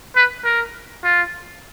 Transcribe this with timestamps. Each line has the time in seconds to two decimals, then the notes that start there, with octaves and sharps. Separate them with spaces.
0.16 B4
0.44 A#4
1.04 F4